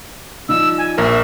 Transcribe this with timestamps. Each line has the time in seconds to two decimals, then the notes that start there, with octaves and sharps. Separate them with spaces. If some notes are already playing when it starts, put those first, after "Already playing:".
0.49 F3 G3 D#4 E6
0.78 G#5
0.98 A#1 A#4 E5